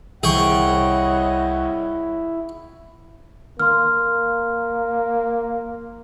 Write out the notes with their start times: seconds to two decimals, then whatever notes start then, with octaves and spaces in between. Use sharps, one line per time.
0.23 C2 E4 G#4 C#5 D#5 F#5 G5 C#6
3.59 A#3 C6 F6